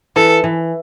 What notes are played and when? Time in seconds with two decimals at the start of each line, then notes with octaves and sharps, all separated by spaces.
0.16 E3 A4
0.44 E3